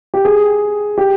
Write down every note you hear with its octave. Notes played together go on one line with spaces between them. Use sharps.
G4
G#4
G4